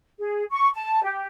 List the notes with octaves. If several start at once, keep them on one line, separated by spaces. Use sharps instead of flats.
G#4
C#6
A5
G4